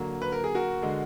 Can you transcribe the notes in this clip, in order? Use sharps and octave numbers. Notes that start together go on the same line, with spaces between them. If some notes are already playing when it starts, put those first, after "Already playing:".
Already playing: D3 F#3 A#3
B4
A#4
G#4
F#4 A#4
D3 G#3